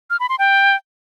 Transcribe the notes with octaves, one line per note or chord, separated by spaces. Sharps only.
F6
B5
C6
G5